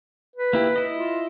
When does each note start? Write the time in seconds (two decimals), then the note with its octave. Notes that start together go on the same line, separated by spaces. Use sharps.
0.36 B4
0.53 A#3 E4 G4
0.76 E4 D#5
0.97 F4